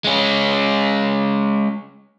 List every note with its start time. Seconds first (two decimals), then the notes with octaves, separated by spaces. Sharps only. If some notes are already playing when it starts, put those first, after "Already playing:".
0.04 G#3 C#4